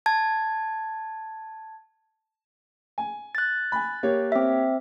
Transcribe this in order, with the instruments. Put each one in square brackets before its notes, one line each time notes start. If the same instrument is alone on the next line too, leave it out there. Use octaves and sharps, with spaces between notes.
[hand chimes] A5 G#6
[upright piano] G#5
[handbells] F#6 A6
[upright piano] G#5 B5
A#3 G4 C#5
[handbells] C4 E5